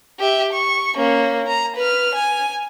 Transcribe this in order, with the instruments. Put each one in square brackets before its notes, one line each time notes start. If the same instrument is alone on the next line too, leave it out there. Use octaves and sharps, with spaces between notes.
[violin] G4 E5
C#6
A#3 C#4
A#5
B4 F6
G#5